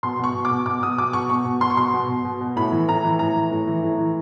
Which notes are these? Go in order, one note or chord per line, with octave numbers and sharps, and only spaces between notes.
B2 C6
B2 C#6
B2
D6
B2
B2 D6
B2 D#6
B2 D6
B2 C#6
B2 C#6
B2
B2 C6
C#6
B2 C6
B2
B2
B2
B2
A2 B5
E3
A2 A#5
E3
A2 A#5
E3
A2
E3
A2
E3